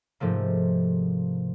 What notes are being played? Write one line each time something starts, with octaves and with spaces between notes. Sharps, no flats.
G#2 C3 F3 A3 A#3